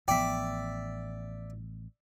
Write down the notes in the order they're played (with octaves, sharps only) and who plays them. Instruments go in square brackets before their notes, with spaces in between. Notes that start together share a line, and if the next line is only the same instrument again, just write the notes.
[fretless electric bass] A1 F3 B3 [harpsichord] D5 E5 [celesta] G5